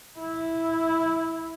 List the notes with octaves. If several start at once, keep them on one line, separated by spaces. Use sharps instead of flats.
E4